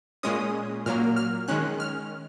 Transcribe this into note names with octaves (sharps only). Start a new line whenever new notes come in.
A#2 G#3 C#4 D#6
A#2 F#3 A#3 F6
F6
D#3 G#3 C#4 F#6
F6